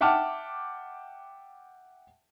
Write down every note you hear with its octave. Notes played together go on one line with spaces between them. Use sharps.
E5 F#5 G5 A5 D6 F6